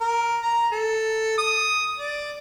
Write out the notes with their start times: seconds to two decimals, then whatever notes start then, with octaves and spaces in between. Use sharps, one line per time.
0.01 A#4
0.43 A#5
0.72 A4
1.38 D#6
1.98 D5